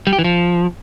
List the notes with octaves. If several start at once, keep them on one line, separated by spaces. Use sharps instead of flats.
G3
G4
E3
F3